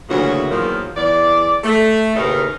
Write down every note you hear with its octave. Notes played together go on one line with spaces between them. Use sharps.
D2 A#2 C#3 E3 F#3 F#4
E2 A#2 D#3 F3 F#3
E2 D5
A3
D#2 A2 C#3 D#4 A#4 B4